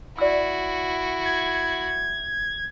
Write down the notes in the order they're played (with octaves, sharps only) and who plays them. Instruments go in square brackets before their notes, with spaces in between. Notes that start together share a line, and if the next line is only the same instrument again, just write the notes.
[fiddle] E4 F#4 [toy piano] D5 E6
[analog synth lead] G#6